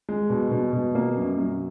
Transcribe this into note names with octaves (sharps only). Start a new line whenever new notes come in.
G#3
B2
B2
B2
A#3
F#2
F#3